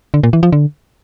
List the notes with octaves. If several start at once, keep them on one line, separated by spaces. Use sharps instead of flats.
D3
A#2
E3
F3
D3